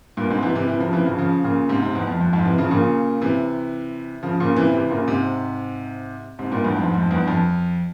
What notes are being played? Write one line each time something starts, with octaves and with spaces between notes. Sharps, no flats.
G2 A#2
G#2 C3
C3 E3
C3 E3
C3 E3
C#3 F3
C3 E3
C#3 F3
C#3 F3
A#2 C#3
G#2 C3
G#2 C3
E2
F2
F2
F2 G#2
C3 E3
C#3 F3
A#2 C#3
C3 E3
C#3 F3
A#2 C#3
C3 E3
C3 E3
C3
A#2 C#3
G#2 C3
G#2 C3
G2 A#2
E2 G2
F2 G#2
F2 G#2
E2 G2
F2